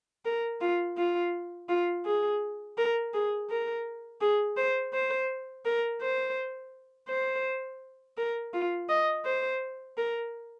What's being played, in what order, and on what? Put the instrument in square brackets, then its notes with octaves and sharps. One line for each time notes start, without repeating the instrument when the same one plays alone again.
[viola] A#4
F4
F4
F4
G#4
A#4
G#4
A#4
G#4
C5
C5
A#4
C5
C5
A#4
F4
D#5
C5
A#4